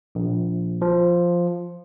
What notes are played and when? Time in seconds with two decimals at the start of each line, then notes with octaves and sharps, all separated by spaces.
0.15 A#1
0.82 F3